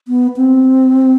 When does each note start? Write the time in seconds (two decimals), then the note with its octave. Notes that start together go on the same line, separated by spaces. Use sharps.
0.08 B3
0.37 C4